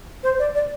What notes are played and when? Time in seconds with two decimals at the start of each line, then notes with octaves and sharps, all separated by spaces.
0.23 C5
0.39 D5
0.55 D5